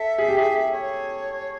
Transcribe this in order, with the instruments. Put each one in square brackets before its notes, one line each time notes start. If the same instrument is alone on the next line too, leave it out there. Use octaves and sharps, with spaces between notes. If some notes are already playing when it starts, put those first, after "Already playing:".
Already playing: [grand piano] A4 [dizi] E5
[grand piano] G#4
G4
G#4
[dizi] C#5